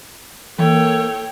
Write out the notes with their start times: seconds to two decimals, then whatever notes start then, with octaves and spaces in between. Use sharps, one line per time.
0.59 E3 A#3 A4 C#5 G5